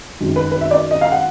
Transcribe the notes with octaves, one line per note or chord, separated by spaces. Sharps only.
F#2 D#3 G#3
B4
B4
E5
D5
D#5
F5
F#5